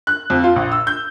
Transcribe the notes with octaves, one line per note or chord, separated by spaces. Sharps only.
F#6
F2
F4
A#1
E6
G6